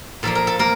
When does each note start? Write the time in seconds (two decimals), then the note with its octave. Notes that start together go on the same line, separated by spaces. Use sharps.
0.23 A#2 F3 A#3 A4
0.35 A#4
0.47 A4
0.59 A#3 A#4